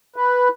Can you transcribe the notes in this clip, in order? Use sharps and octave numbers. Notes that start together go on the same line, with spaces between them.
B4